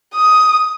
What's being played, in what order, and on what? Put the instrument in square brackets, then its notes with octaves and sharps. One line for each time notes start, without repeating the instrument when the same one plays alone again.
[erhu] D#6